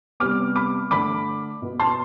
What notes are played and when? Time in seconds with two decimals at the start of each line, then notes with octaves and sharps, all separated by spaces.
0.20 C3 G3 B3 D6 F6
0.56 B5 D6
0.91 D3 A3 B5 D6
1.62 B2 B3
1.80 A5 C6